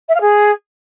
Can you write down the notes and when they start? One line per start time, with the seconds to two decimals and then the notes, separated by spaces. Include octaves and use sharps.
0.08 E5
0.14 F5
0.20 G#4